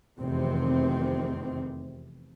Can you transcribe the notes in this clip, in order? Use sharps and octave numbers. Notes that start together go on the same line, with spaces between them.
F1 E2 C3 D#3 C4